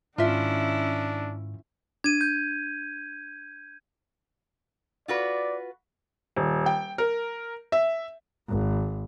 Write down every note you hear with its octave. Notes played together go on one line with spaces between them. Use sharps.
G#2 D#3 C#4 D4 E4 F4 E5
D4 G#6 D#7
G6
F4 F#4 B4 D5
D#1
G5
A#4
E5
G#1